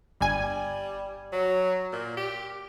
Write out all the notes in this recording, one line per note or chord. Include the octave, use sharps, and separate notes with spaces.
G1 G3 G#5
F#3
A#2
G4